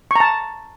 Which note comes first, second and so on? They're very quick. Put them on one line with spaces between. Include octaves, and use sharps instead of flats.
C#6 A#5 A5